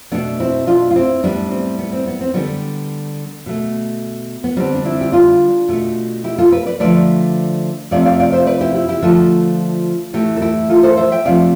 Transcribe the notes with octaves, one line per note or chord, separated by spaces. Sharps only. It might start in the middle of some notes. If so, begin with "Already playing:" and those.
B2 A3 B3 D4
C4 E4
D4 F4
F4
C4 E4
A2 G3 B3 D4
C4
B3
C4
B3
C4
D3 G3 B3
B2 A3
B3
D3 G3 C4
D4
C4 E4
G4
D4 F4
B2 A3
E4 G4
F4 A4
G4 B4
B4 D5
D3 F3 A3 B4 D5
C3 F3 A3 D5 F5
D5 F5
D5 F5
C5 E5
B4 D5
E4 G4
E4 G4
E4 G4
D3 F3 A3 F4 A4
A2 E3 A3 E4 G4
A4
E4 G4
F4 A4
A4 C5
C5 E5
E5 G5
C3 F3 A3 D5 F5